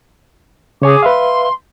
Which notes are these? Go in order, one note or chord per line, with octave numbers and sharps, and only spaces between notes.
C#3 G#4 C#5 G#5 D6
B4 E5 F5 C6